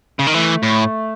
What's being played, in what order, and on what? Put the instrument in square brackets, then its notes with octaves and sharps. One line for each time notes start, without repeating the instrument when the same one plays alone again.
[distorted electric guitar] C#3
D#3
[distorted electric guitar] E3 [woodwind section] A3
[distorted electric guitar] A2